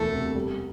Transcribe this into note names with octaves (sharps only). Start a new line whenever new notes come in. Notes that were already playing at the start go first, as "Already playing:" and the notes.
Already playing: E1 D2 E3 A3 A4
C3
G3